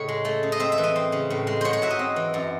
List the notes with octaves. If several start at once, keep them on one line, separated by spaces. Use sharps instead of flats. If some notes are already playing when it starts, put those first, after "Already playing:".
Already playing: A2 C#3 C#5 D#5
G#3
A3
C#3
D#5
C4 E5
E5
E3
D#5
C4
C#3
A2
G#3
G#2 C5 C#5
C#5
F#3 E5
D#5
C4
E3
F#2